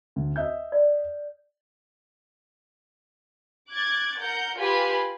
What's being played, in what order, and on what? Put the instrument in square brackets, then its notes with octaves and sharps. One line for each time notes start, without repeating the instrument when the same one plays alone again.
[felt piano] D2
D#5 E5 G6
[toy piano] D5
[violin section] D6 F#6 G#6 A6
A#4 F#5 G6
F4 G4 B4 G#5 B5 C6